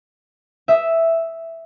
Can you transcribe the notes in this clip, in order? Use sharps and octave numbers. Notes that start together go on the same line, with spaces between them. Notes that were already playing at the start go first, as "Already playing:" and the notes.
E5 D#6